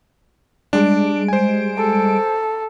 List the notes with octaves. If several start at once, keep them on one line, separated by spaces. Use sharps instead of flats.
G3 G#3 D4 D7
C5 G#5
A4